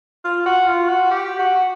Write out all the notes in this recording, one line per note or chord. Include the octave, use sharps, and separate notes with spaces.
F4
F#4
F4
F#4
G4
F#4